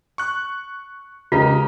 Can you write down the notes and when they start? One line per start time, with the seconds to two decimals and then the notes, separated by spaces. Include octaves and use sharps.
0.18 C#6 F#6
1.32 C#3 G#3 F4 G4 A#4 D#5